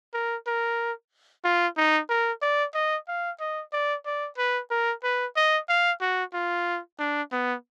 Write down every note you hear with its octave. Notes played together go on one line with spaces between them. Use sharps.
A#4
A#4
F4
D#4
A#4
D5
D#5
F5
D#5
D5
D5
B4
A#4
B4
D#5
F5
F#4
F4
D4
B3